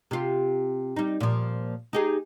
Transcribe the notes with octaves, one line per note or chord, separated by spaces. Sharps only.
C3 F4
G3 D#4
A#2 F3
D#4 G4 G#4